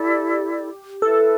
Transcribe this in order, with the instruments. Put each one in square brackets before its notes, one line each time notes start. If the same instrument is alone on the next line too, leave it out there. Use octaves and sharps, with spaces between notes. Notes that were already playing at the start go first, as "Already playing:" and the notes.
Already playing: [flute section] E4 A4 D5 [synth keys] G4
[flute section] E4 B4 E5 [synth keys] A4